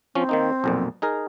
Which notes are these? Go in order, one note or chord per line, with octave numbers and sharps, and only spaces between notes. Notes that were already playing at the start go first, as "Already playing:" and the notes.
F3 C4 C#4
D#3 A#3 D#4
B1 F2 A#2
D#4 G#4 A#4